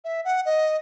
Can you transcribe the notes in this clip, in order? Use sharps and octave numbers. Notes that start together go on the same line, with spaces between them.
E5
F#5
D#5